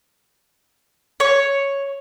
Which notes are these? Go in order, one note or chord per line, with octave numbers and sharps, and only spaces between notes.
C#5